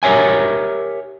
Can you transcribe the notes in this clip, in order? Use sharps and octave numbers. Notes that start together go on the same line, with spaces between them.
G4 A#4 C#5 E5 G#5